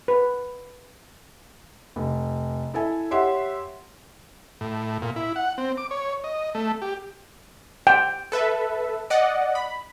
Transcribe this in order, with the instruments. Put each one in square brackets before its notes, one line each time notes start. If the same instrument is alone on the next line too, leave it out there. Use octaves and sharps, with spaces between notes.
[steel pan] B4
[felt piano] F1
E4 A4 E5 G#5
G4 C#5 E5 F#5 C6
[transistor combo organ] A2
A#2
E4
F#5
C4
D6
C#5
D#5
A3
G4
[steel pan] G5
[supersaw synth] A4 B4 E5
D5 D#5 F#5
B5